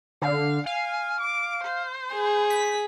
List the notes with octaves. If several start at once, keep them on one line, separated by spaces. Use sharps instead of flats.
D3 F5
F5 G#5
D6
C5
G#4
B6